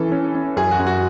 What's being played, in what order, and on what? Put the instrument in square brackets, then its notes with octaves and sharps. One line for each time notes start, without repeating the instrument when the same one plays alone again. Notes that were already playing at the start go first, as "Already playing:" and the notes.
Already playing: [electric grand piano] E3 C#4 [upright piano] A4
[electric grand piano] C#4
C#4
[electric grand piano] F#2 [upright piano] G#4
[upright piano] F#4
[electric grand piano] F#2
[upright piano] F#4